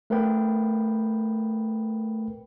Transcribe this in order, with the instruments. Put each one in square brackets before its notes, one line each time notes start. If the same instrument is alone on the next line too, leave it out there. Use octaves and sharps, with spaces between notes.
[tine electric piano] A3 A#4 B4 G5 B5